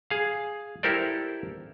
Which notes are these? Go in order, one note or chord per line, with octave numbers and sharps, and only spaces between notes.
G#4 F5
E4 G4 A4 A#4 C5 D5